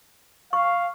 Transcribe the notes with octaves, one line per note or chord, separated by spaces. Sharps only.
F5 C#6